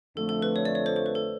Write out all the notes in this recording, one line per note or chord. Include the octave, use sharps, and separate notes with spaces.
F2 D3 F3 A3 A4
A4
B4
C#5
D5
C#5
C5
C5
B4
A4